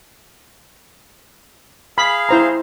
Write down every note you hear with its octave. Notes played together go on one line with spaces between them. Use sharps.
G#4 F5 B5
E4 C5 A#5